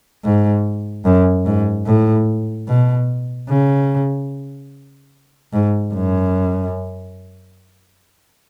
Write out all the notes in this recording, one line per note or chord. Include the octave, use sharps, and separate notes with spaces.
G#2
F#2
G#2
A2
B2
C#3
G#2
F#2